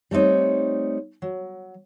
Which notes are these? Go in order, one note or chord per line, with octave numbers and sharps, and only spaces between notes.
G3 A3 C4 D#4 C#5
F#3